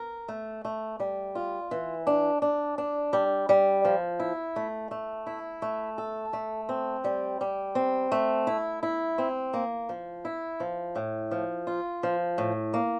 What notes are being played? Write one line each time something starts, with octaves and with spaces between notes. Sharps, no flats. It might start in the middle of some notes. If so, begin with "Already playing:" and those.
Already playing: A#4
A3
A3
G3
F4
E3
D4
D4
D4
G3
G3
F3
E4
A3
A3
E4
A3
A4
A3
C4
G3
G3
C4
A3
E4
E4
C4
A#3
F3
E4
F3
A2
F3
F4
F3
A2
A#3